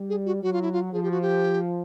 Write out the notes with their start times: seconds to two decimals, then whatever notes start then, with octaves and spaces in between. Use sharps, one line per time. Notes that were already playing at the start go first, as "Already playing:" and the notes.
Already playing: G3
0.09 G#4
0.26 F#4
0.43 F#3 F#4
0.53 F4
0.62 E4
0.73 F4
0.93 F3 G#4
1.03 G4
1.11 F#4
1.22 G4